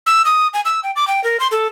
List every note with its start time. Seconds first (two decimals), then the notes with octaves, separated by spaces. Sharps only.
0.06 E6
0.25 D#6
0.54 G#5
0.65 E6
0.83 G5
0.96 D6
1.07 G5
1.24 A#4
1.40 C6
1.51 A4